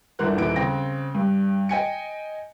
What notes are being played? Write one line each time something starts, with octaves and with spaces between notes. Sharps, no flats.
G1 D3 E3 A#4 F#6
D#1 D#2 E3 D7
C#3 C4 G5 A#6
G2
D#5 G5 G#5 C#7